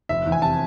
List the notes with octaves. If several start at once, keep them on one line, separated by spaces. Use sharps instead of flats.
F1 E5
E2
G#5
C3 A5